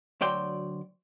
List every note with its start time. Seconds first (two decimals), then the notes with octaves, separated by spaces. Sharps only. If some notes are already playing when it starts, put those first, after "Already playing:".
0.21 D2 F#3 D5 G5 C6